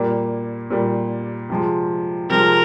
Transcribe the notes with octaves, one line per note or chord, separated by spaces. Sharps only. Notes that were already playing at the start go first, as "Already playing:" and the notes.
Already playing: A#2 G3 A#3
A#2 G3 A#3
C3 F3 G#3
C3 F3 G#3 A#4